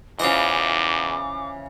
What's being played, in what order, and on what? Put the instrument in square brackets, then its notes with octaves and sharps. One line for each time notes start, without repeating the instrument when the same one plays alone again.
[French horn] E2 [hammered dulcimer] C#3 E3 [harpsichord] F4 C5 D#5 [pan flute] D6